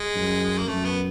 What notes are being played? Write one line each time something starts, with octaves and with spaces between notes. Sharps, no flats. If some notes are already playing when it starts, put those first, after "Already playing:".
Already playing: G#3
F#2
A#3
F#2 A3
B3